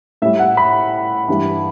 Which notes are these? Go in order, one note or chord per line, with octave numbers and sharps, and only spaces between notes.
A2 G3 E5
F#5
B5
G2 E3 G3